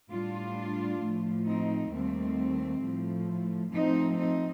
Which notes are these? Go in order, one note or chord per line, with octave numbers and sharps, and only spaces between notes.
A2 G3 D4 F4
A2 F3 A3
C4 D#4
D#2 D#3 G3 A3 C4
A2 F3 A3
A2 F3 A3 C4 D#4
C4 D#4